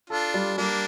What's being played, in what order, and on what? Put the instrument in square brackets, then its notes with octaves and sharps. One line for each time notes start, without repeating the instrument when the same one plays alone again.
[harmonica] D4 F4 [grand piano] A4
[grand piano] G3
[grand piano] G3 [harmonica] A#3 D4